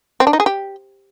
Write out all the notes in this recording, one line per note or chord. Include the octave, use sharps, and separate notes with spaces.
C4
D4
D#4
G#4
G4